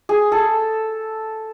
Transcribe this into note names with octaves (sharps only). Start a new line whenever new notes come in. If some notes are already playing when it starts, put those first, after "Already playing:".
G#4
A4